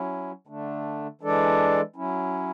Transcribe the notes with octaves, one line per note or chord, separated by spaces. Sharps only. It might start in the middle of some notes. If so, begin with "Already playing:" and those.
Already playing: F#3 C#4 E4
D3 A3 D4
E3 G#3 D4 A4 D5
F#3 C#4 E4